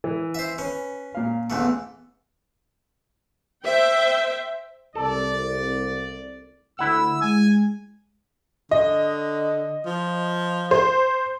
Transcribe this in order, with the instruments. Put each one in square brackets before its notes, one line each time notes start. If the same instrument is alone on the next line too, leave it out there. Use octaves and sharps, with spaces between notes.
[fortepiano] E3
[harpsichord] C5 E5
[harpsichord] C#4 [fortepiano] B4
[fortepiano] A#2 F5
[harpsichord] A1 E2 A3
[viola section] C5 E5 G5
[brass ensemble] C2 [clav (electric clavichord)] A4 [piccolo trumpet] D5
[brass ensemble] D2 [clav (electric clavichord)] E4 F#5 [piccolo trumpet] E6
[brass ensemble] G#3 [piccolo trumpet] G#5
[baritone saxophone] D3 [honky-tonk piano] D#5
[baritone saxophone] F3
[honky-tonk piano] C5